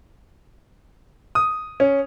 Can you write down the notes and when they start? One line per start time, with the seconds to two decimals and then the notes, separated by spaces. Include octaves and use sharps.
1.35 D#6
1.80 C#4